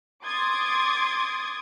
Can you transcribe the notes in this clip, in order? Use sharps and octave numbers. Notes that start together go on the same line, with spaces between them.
C6 D6 D#6 G#6 A6